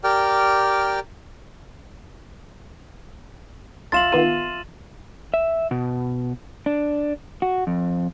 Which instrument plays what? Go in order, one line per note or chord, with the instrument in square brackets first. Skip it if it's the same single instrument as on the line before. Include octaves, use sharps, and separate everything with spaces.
[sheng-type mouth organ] G4 A#4 D5 G5 F6
[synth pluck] C2 [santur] F4 E5 C6 [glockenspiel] A6 E7 F#7
[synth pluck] D#3 B3 F4 [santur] C6 [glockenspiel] D#7
[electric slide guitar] E5
B2
D4
F#4
F2